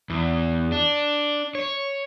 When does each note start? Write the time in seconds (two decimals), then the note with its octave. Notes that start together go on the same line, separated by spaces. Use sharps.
0.10 E2
0.72 D4
1.55 C#5